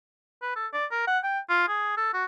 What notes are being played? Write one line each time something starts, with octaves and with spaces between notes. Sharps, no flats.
B4
A4
D5
A#4
F#5
G5
F4
G#4
A4
F#4